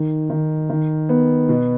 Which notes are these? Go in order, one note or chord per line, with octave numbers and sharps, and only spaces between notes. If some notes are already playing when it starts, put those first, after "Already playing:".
Already playing: D#3
D#3
D#3
B3
B2